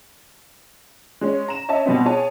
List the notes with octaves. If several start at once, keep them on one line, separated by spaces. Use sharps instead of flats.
G#3 C#4
A#5 E7
C#4 C#5 D#5 E5 A5
B2 G3 B3 C4
G#4 C#5 A5